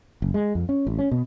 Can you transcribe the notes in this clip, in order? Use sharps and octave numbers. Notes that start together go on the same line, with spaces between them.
F#1
G#3
F2
C#4
A1
C#4
B2